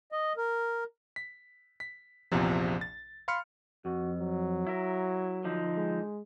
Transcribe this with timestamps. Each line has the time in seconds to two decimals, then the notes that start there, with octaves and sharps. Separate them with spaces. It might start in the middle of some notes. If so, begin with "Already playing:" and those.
0.12 D#5
0.37 A#4
1.16 B6
1.80 B6
2.31 A#1 E2 C3 F3
2.81 A6
3.28 F5 B5 C6 F6 C#7
3.85 F2 F#4
4.20 F#3
4.67 E4 A#4
5.44 D3 F3 D#4
5.77 G#3